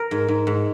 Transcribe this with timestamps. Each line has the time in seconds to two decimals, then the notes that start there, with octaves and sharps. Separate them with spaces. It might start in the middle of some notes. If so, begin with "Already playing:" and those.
Already playing: A#4
0.11 G#2
0.28 G#2
0.47 G#2